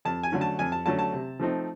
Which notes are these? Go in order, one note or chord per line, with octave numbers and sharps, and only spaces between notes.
F2 A5
G#5
D3 F#3 A3 C#4
A5
F2 G#5
A5
D3 F#3 A3 C#4 A5
A5
C3
F3 A3 C4 D#4